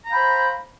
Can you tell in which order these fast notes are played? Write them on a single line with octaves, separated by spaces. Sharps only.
A#5 F5 G5 B5 C5